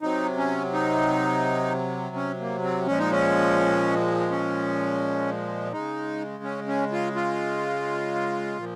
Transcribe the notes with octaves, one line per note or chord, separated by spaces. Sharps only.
C3 F#3 D#4
C#4
D#4
C#4
A#3
C4
A#2 F3 G#3 C#4
D#4
C#4
C#4
C#3 G#3 D#4
C#4
C#4
F4
F4
A#2 F3